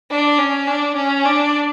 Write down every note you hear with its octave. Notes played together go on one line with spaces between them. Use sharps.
D4
C#4
D4
C#4
D4